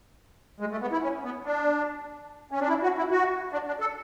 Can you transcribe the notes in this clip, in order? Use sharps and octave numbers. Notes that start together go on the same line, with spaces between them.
G#3
A3
B3
E4
C#4
B3
D4
C#4
D4
E4
F#4
E4
F#4
D4
D4
A4